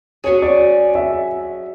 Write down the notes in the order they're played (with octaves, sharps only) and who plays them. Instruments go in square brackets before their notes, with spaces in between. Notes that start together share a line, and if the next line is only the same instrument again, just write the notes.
[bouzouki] F#3 C#4 G#4 [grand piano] C#5
[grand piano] D5
E5